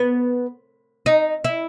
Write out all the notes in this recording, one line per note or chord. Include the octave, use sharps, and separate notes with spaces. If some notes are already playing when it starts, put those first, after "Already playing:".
Already playing: B3
D#4
E4